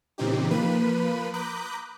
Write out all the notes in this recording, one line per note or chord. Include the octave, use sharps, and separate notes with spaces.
A#2 C#3 E3 C4 D#4 G4
F3 A#3 B4 B5 D#7
A#5 B5 D6 D#6 F#6 G6